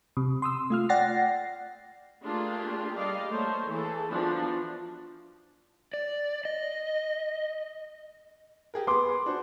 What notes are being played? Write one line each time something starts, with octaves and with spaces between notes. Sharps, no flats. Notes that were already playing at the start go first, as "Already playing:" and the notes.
C3
C6 D#6 E6
A3 F4 F6
D5 F#5 G5 A6 A#6 C7
A3 A#3 D4 F4 G4 G#4
G3 D5 D#5 F5
A3 A#3 C5 C#5
E3 G#4 A4
E3 F3 B3 D4 F#4
D5
D#5
G4 G#4 A#4
B3 G#4 C6 D6
D4 F#4 C5